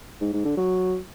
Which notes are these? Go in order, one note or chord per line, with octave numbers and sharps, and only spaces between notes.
G#2
G#2
D3
F#3